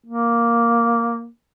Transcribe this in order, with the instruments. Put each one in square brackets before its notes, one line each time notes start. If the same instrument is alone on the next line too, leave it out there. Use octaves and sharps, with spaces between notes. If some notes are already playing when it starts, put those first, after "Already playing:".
[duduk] A#3